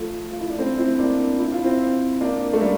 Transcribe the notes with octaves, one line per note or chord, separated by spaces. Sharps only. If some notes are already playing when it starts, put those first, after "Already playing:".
Already playing: F3 A3
F4
E4
D4
A3 C4
C4 E4
A#3 D4
E4
F4
C4 E4
A#3 D4
A3
G3 A#3